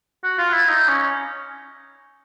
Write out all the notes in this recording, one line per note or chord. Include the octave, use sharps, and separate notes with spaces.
F#4
F4
E4
D#4
C#4